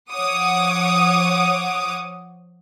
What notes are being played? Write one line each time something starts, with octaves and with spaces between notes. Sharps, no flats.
F3 C#5 F#5 D6 D#6